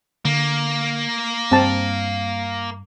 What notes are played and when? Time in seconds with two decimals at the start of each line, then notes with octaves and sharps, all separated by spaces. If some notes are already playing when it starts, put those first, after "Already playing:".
0.25 D3 A#3
1.52 G2 C4 A5